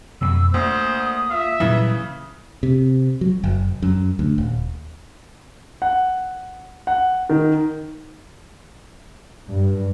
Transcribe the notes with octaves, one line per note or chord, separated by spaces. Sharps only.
F2 B2 E6
D2 A#3 C5 D#6
F4 E5
A#2 C#3 E3 F#3 G3 D#6
C3
F#3
F#1
F#2
D2
D#1
F#5
F#5
D#3
G2